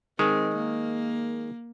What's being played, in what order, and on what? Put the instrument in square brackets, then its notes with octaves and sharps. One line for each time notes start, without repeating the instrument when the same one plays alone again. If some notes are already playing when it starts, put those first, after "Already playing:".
[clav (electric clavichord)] D#3 G#3 [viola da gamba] C4
[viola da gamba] A#3